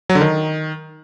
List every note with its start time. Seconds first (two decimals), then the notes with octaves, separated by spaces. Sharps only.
0.10 F#3
0.15 D3
0.21 D#3